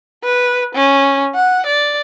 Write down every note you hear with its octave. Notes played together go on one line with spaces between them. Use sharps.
B4
C#4
F#5
D5